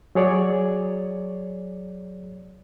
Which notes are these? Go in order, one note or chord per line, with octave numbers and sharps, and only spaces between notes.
F#3 G#4 C#5 D5